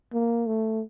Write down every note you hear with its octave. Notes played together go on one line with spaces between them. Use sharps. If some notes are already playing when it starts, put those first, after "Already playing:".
A#3
A3